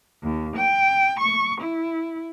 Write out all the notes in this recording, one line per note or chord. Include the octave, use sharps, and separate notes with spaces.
D#2
G5
C#6
E4